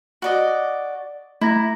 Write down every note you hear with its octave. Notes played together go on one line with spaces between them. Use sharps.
F#4 D5 D#5
A3 E4 A#5 A#6